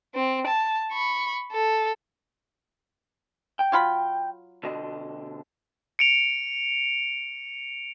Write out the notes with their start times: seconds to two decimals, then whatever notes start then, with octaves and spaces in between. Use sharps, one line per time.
0.15 C4
0.47 A5
0.92 B5 C#6
1.52 A4
3.59 G5
3.72 F#3 F4 B5
4.63 B2 D3 D#5
5.99 C#7 D7 F7